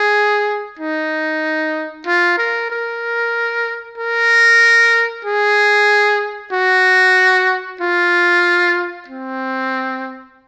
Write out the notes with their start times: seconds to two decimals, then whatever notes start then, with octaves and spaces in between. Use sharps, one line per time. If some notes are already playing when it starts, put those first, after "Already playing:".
Already playing: G#4
0.79 D#4
2.06 F4
2.38 A#4
2.70 A#4
3.98 A#4
5.25 G#4
6.53 F#4
7.81 F4
9.08 C4